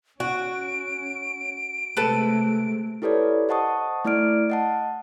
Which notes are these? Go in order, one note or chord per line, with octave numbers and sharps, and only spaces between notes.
C#4 F#4 D7
C3 G#3 A3 A4 B4
E4 G4 A4 B4 C#5 D5
C5 D#5 F#5 A5 C#6 D#6
A3 E4 D5 F6 D7
D#5 F#5 A5